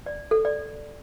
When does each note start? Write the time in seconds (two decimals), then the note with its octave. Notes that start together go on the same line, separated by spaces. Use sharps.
0.06 D5
0.31 A4
0.45 D5